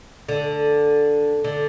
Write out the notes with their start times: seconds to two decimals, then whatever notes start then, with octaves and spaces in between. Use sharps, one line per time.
0.29 D3
1.44 D3